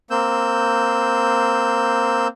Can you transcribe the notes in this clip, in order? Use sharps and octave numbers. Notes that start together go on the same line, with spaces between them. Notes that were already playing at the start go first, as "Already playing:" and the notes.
A#3 C4 E6 G6